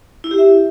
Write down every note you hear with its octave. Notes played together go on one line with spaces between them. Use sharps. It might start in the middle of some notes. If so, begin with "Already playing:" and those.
E4
G4
E5